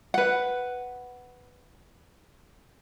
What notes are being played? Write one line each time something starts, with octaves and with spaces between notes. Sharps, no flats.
B4 F#5